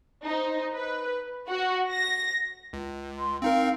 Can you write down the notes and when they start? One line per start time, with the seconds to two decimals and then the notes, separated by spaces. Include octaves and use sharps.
0.24 D#4 C5
0.74 B4
1.49 F#4
1.92 A#6
2.73 C#2
3.19 C6
3.42 C4 D#4 A#4 F5